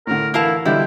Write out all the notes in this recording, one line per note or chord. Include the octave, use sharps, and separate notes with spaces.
A2 D3 A#4
E3 E4 A#4 F5 A5
B2 D3 G3 E4 G5